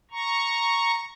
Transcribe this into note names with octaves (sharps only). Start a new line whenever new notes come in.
A#5 C#6